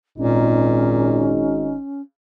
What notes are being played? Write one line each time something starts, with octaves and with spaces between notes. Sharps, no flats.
G#1 A#2 C#4 D#4